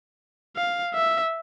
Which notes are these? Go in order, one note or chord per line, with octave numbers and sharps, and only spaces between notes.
F5
E5